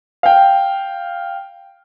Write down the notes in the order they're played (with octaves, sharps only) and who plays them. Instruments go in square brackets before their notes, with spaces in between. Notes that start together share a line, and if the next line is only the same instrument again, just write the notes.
[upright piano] F5 G5